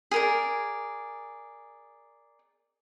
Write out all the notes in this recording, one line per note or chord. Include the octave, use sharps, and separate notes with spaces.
G#4 A#4 D5